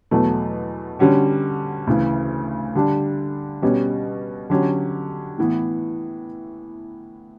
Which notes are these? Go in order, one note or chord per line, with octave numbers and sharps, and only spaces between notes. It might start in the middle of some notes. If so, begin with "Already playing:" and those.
E2 B2 F#3 A3
D3 G3 C#4 F#4
D2 C#3 E3
D3 G3 D4
B2 G3 C#4
D3 F#3 C#4 G4
A2 E3 B3